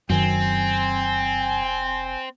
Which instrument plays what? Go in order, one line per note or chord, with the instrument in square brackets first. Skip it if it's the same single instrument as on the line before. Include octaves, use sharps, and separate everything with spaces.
[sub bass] F1 [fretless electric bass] F#2 D#3 [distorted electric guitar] C4 [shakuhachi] G#5